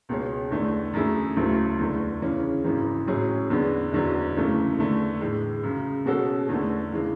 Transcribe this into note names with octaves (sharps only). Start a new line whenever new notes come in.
C#2 B2 G#3 C#4
E2 D3 A3 D4
F#2 E3 A3 E4 G#4
D2 C#3 F#3 A3 E4
E2 D3 A3
C#3 E3 G#3 C#4
G#1 F#2 C#3 E3
A2 F#3 C#4 G#4
E2 D3 G#3 B3 D4
F#1 E2 D3 F#3
F#2 C#3 E3 A3
E2 D3 A3
A2 E3 G#3
F#2 C#3 G#3
B2 G#3 C#4 F#4 A4
E2 D3 A3
C#3 E3 G#3